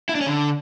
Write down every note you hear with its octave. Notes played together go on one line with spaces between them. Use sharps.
E4
D4
C#4
D3